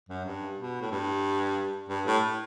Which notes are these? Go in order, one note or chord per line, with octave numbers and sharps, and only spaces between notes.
F#2
G2
B2
A2
G2
G2
A2